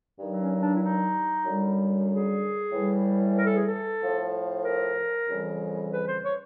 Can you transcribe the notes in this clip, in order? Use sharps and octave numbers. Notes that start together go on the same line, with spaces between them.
G2 D#3 F#3
C#4
D4
E4
D#4
F#2 D3 G3
G#4
A2 E3 G3
A#4
A4
G#4
A4
A2 F3
A#4
F2 C#3 E3 G3
B4
C5
C#5